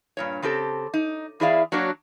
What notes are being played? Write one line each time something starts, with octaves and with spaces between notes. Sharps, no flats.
G2 A#2 C#5
C#3 C4 G4 A4
D#4
E2 E4 G#4 D5 E5 F5
F#3 A#3 D4 F#4 C#5